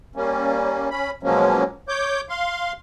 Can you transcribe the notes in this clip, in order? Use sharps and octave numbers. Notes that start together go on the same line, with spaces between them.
G3 A#3 C#4
C#4 B5
B2 F3 F#3 G#3 A#3 C#4
C#5 D6 G6
F5 C6